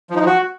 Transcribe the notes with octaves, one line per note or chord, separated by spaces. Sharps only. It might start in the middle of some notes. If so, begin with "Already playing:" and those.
F3
D#4
F3
F#4